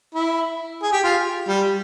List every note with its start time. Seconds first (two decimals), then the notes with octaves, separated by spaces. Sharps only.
0.14 E4
0.83 G#4
0.92 G4
1.04 F4
1.48 G3